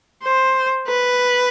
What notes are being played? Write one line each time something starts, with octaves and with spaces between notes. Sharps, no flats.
C5
B4